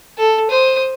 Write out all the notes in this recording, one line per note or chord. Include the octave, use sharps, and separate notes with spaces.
A4
C5 D#6